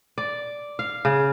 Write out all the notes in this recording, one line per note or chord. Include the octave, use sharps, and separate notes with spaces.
D5
F5
C#3